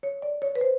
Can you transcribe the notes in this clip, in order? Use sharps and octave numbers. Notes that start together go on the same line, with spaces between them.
C#5
D5
C#5
B4
C5